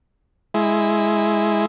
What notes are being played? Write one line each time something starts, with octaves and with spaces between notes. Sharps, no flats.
G#3 E4